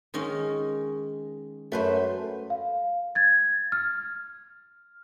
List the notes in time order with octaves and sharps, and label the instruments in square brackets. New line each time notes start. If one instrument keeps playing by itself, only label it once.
[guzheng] D#3 G#3 C#4
[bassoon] F#2 [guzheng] A3 B4 C5
[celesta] F5
G#6 A6
F6